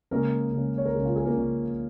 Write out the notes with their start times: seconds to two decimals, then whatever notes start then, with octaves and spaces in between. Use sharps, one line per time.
0.11 C#3 G#3 A#3 C#4 A#4
0.52 C#3 G#3 C#4
0.78 C#5
0.85 A#4
0.95 C#3 G#3 C#4 G#4
1.05 F4
1.16 G#4
1.25 A#3 A#4
1.36 C#3 G#3 C#4